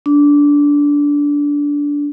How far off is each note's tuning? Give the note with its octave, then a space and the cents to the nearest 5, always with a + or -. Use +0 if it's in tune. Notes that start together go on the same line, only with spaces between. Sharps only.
D4 -15